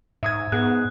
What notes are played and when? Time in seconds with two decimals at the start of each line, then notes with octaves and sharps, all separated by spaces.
0.23 G#2 E5 D#6 G#6
0.52 G#2 B3 G#4 F#6